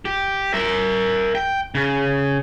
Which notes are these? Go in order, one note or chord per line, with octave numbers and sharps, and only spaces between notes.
G4
A#4 E5
G5
C#3